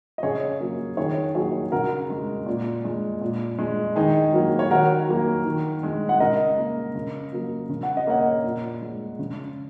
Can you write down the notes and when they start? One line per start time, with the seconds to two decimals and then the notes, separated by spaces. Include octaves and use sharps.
0.18 D#5
0.23 C#3 G#4 C#5
0.60 F#3 A#3
0.97 D#3 G#4 C#5
1.35 F#3 A#3 G#4 C#5
1.72 C#3 F#4 A#4
2.10 G#3
2.46 A#2
2.84 G#3
3.21 A#2
3.58 G#3
3.96 D#3 D#4 G#4
4.33 F#3 A#3
4.59 C#5
4.71 D#3 F#4 A#4
5.08 F#3 A#3
5.45 D#3
5.83 G#3
6.09 F#5
6.20 C#3 A#4 D#5
6.57 A#3
6.95 C#3
7.32 F#3 A#3
7.69 C#3
7.83 F#5
7.97 D#5
8.07 A#3 C#5 F#5
8.44 A#2
8.81 G#3
9.19 C#3